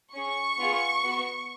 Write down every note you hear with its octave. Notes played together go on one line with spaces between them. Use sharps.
C#4 G#4 C#6
B3 F4 G#4
B3 F#4